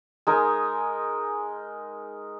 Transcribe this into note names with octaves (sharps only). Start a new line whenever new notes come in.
G#3 D#4 A#4 G#5